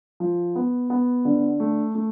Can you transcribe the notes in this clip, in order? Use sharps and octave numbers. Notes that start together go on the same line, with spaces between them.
F3
B3
B3
D3
A3
A3